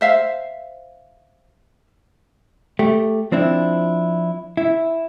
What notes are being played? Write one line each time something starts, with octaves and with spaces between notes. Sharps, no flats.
C5 E5 F5
A3 G4
F3 C4 D4 E4
E4